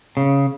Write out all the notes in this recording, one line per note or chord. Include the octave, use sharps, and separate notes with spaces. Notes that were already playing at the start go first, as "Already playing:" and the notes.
C#3